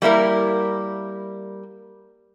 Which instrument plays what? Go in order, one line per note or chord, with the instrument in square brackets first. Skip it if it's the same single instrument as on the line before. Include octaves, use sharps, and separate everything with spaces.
[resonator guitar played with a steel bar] G3 A#3 E4 A#4